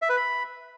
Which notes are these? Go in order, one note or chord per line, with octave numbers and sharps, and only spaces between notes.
E5
B4
B5